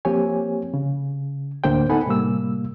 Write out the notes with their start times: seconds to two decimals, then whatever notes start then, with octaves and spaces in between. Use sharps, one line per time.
0.05 F3 A#3 C4 G4 C#5 G#5
0.74 C#3
1.64 D2 A2 D3 A#3 C5 G5
1.89 B3 D#4 A4 F#5 G#5 B5
2.06 A2 C3 G3 A#3 E6